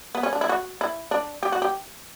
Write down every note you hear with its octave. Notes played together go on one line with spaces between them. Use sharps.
B3
C#4
D4
E4
F#4
E4
D4
G4
F#4
G4